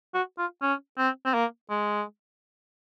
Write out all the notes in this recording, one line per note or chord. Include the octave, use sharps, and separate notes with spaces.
F#4
F4
C#4
C4
C4
A#3
G#3